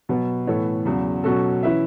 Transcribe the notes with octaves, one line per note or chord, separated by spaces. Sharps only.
B2 F#3 B3
A2 E3 B3 A4 C#5
E2 C#3 F#3
B2 F#3 C#4 F#4 A4
E3 C#4 E4 B4 E5